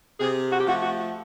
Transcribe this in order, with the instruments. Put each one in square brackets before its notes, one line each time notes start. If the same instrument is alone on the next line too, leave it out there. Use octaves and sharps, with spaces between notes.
[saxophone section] C3 G#4
F#4
G4
F3 A3 F#4
F#4